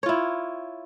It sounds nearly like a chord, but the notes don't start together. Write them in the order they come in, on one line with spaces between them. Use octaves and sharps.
C#5 F4 E4